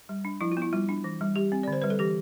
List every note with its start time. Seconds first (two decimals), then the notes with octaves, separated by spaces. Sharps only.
0.09 G3
0.25 D4
0.41 F3 E4
0.52 F4
0.57 B3
0.62 E4
0.73 G3 F4
0.89 D4
1.04 E3
1.21 G3
1.36 G3 G4
1.52 C4
1.63 D5
1.68 D3 C5
1.82 G3 B4
1.90 A4
1.99 E3 G4